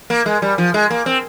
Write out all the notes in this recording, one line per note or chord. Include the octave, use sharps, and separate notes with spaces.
A#3
G#3
G3
F3
G#3
A#3
C4